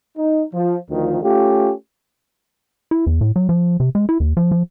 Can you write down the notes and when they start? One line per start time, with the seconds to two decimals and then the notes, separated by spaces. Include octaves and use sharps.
0.17 D#4
0.54 F3
0.90 D2 D#3 F3
1.22 A3 C#4 F4 G4
2.91 E4
3.07 E2
3.21 A2
3.36 F#3
3.49 F3
3.80 C3
3.95 G#3
4.09 E4
4.20 D#2
4.37 F3
4.52 F3